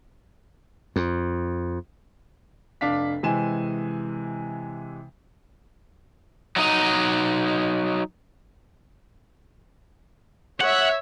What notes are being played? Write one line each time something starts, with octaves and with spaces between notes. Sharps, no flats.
F2
F1 D4 F5 B6
C3 E3 G#3 G#5 E7
F#3 D#4 D#5
C#5 E5 F#5